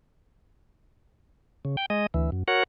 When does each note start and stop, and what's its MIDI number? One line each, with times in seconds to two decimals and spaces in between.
1.65 1.76 49
1.77 1.86 79
1.90 2.06 56
1.90 2.06 75
2.14 2.30 38
2.14 2.30 52
2.32 2.43 42
2.48 2.63 66
2.48 2.63 70
2.48 2.63 73
2.48 2.63 78